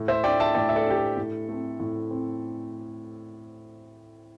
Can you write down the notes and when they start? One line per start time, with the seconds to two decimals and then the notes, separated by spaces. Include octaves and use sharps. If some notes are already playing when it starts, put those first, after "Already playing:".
Already playing: A2
0.08 C5 E5
0.24 A3 D4 D5 G5
0.40 E5 A5
0.55 A2 D5 G5
0.69 E5
0.76 A4 D5
0.86 A3 D4 G4
0.97 A4
1.17 A2
1.49 A3 C4
1.80 A2
2.11 C4